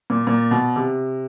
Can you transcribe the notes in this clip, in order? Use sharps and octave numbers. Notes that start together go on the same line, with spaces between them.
A#2
A#2
B2
C3